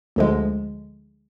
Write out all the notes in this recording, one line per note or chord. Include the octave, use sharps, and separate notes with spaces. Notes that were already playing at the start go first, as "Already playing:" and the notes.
D2 D3 F3 G#3